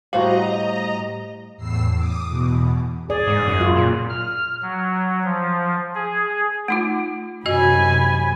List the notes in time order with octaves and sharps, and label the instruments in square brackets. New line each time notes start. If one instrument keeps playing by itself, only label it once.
[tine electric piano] A2 G3 G4 [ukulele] F#4 C5 F5 [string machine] D#5 A#5
[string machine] E2 A2 E6 C7
D6 D#6
E2 B2
[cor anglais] G#4 [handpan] D5
[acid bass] G#2
F#2
[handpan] F4
[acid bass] A#2
[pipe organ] F6
F#3
F3
G#4
[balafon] A3 D#4 F4
[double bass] F#2 C3 [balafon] F#4 D#5 [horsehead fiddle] G#5 B5